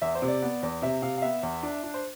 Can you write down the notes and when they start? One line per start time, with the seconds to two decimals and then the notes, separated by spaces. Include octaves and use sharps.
0.02 E2 E5
0.15 C5
0.22 C3
0.28 D5
0.42 B3
0.63 E2
0.82 C3 E5
1.02 C3 F5
1.18 F5
1.22 B3 E5
1.43 E2
1.63 D4
1.83 D4
1.94 C5